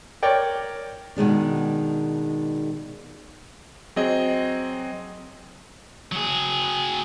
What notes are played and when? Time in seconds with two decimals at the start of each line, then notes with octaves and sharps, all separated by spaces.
0.23 A#4 C#5 D5 G5
1.16 B2 D#3 G#3 D4
3.96 F#3 C4 G#4 D#5
6.12 F#3 G#4